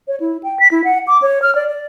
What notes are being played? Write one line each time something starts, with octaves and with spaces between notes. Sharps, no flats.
C#5
E4
G5
B6
E4
F#5
D6
C#5
F6
D5
D5